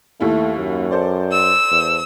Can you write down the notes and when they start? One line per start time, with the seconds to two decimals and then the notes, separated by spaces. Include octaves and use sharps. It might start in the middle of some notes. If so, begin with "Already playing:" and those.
0.20 D#2 A3 E4
0.59 F#2
0.91 A4 C5 D5
1.32 E6
1.71 E2